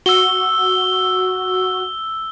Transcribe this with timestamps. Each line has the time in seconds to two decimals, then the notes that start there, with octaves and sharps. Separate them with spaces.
0.06 F#4 E6 G7